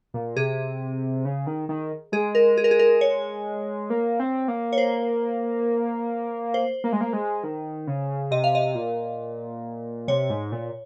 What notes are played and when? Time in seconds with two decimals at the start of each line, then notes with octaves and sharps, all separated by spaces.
0.14 A#2
0.36 C3 G#4
1.25 C#3
1.47 D#3
1.69 D#3
2.12 G#3 G#4
2.35 A#4
2.57 G#4
2.64 A#4
2.71 G#4
2.79 A#4
3.01 C#5
3.90 A#3
4.20 C4
4.48 A#3
4.73 C#5
4.78 C5
6.54 C5
6.84 A#3
6.92 G#3
7.01 A#3
7.13 G#3
7.44 D#3
7.87 C#3
8.31 C3 D#5
8.44 F5
8.55 D#5
8.75 A#2
10.08 C3 C#5
10.30 G#2
10.52 A#2